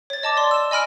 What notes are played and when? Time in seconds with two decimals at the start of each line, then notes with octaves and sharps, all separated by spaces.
0.10 C#5 A6
0.23 D#5 A5 D6
0.37 D5 C6
0.51 E6 E7
0.71 D#5 G#5 B5 F6 D7